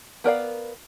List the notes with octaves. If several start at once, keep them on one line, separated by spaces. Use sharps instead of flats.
B3 A#4 D5 F5